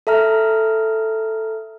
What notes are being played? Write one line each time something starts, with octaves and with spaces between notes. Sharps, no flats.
A4 E5 A#5 F6